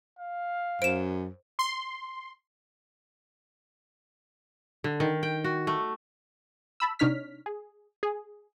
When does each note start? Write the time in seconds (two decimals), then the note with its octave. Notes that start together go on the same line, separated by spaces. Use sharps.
0.19 F5
0.82 F#2 C5 D7 E7
1.59 C6
4.84 D3
5.00 D#3
5.23 G5
5.44 F#4
5.67 A3
6.80 A5 B5 E6
6.99 C3 D4 D#4 C#5 F6 B6
7.46 G#4
8.03 G#4